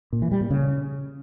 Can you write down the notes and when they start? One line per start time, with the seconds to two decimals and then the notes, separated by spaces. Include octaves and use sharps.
0.13 A#2
0.22 E3
0.32 G3
0.41 A#2
0.51 C#3